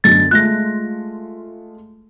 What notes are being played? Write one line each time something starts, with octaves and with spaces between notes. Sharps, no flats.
F#2 B2 D3 A6
G#3 A3 F4 F#6 A#6